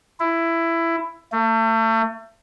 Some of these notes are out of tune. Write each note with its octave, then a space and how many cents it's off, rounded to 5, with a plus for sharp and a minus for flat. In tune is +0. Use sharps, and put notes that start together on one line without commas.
E4 +15
A3 +35